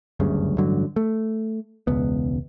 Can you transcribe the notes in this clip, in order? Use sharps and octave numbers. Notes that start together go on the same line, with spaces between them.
F#1 D2 G2 C#3
A1 G2 D3 F#3
A3
E1 C#2 B3